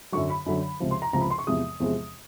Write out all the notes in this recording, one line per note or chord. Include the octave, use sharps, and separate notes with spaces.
F#2 D3 F#3 C#6
B5
F#2 D3 F#3
C#2 C3 F3
C6
A#5
C#2 C3 F3 A#5
B5
C6
C#6
E2 C3 F3 G#3 D#6
E2 C3 F3 G#3